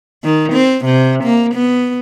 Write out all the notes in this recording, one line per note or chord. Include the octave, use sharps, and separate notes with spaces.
D#3
C4
C3
A#3
B3